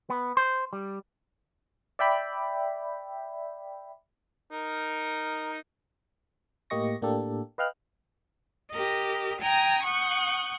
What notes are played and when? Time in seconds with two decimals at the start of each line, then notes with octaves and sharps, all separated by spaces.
0.10 B3
0.37 C5
0.73 G3
1.99 D5 E5 G5 B5
4.50 D#4 A#4
6.70 A2 A#3 G4 D#5 C#6 A#6
7.02 A2 A#3 D4 G4 A4
7.58 B4 D#5 F5 G5 F6 F#6
8.73 G4 A#4 D#5
9.39 G5 G#5 A#5 D#6
9.85 F#5 C#6 D#6 F#6 G6